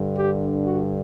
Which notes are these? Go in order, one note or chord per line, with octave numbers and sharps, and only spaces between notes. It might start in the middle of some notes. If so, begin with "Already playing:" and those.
Already playing: G2 D3
G4
F#4